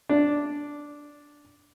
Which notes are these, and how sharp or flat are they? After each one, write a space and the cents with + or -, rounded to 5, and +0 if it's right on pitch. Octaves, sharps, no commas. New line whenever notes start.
D4 -5